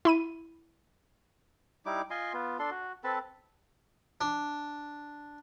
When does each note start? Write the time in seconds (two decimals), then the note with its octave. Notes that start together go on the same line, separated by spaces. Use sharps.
0.05 E4 B5 D#7
1.86 G3 D#4 E4 D6
2.10 F4 D#5 G#5 C6
2.34 B3 F4
2.59 D4 A4 C6
2.71 F#4
3.04 C4 A4 B4 A5
4.21 D4